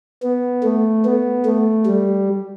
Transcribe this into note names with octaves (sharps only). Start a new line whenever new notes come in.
B3
A3
B3
A3
G3